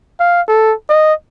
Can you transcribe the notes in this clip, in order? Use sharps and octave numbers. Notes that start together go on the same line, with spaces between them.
F5
A4
D#5